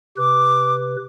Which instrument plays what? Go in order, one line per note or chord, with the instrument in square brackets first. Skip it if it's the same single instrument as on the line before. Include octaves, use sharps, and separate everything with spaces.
[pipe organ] C3 B4 [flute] D6